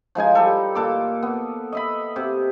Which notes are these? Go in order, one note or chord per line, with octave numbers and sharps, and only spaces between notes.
F3 G#3 D#4 G#5
G3 A4
A#2 A4 D6
B3
D#5 E5 B5
C3